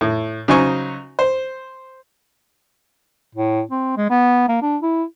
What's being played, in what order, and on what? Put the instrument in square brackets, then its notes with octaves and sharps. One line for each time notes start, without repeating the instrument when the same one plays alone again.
[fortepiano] A2
C#3 F#3 D#4 C5 G#5 C#6
C5
[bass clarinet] A2
C4
G#3
B3
A#3
D4
E4